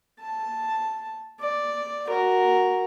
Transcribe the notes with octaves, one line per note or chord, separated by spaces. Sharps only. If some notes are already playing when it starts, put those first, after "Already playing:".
A5
D5
F#4 A#4